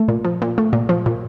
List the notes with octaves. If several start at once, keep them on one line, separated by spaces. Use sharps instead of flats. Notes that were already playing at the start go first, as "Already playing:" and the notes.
Already playing: A3
A#2
F3
A#2
A3
A#2
F3
A#2